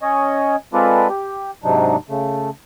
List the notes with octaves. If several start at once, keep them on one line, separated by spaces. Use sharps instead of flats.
C#4 C#5 D#5
G#3 C4 F4 A4 B4 D5
G4
G#2 C3 F#3 D4 D#4
C#3 A3